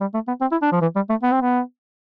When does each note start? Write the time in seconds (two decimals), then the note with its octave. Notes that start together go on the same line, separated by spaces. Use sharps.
0.01 G3
0.14 A3
0.28 B3
0.41 C4
0.51 E4
0.62 D4
0.72 F3
0.81 E3
0.95 G3
1.09 A3
1.23 B3
1.32 C4
1.41 B3